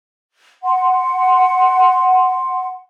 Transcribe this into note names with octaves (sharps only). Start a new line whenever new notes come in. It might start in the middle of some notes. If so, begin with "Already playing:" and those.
F#5 C6